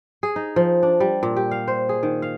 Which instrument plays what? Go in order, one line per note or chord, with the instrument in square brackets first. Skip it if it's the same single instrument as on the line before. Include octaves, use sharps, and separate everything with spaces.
[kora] G#4
D#4
F3
D4
G3
A#2
G4
F5
C5
G#4
D#3
F5